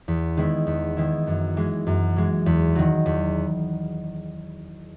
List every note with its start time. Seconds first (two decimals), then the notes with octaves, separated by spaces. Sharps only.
0.08 E2
0.37 D#3 G#3 B3 E4
0.67 E2
0.97 D#3 G#3 B3 E4
1.27 F#2
1.57 E3 G#3
1.87 F#2
2.16 E3 G#3
2.46 E2
2.75 D#3 F#3
3.06 E2